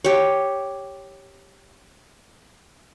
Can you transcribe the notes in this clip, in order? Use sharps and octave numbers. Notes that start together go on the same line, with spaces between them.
G4 C#5